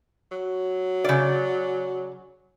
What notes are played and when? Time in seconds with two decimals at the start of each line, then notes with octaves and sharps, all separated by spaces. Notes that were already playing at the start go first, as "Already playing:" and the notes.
0.32 F#3
1.04 C#3 D5